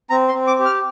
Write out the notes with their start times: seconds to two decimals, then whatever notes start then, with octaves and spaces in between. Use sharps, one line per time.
0.10 C4 A#5
0.28 C6
0.34 C4
0.47 D6
0.59 G4
0.65 F6